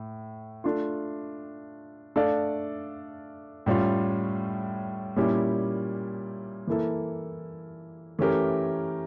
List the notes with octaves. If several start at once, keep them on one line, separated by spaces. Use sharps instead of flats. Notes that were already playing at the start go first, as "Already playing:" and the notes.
Already playing: A2
A3 D4 F4
A3 D4 A4 D5 F5
A2 G3 C#4 F4
A#2 G3 C#4 E4 G4
E3 A#3 E4 A4
E3 A3 C#4 G4 A#4